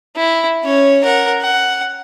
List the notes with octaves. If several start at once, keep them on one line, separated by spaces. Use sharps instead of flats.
E4
C#4 C#5
A#4 F#5
F#5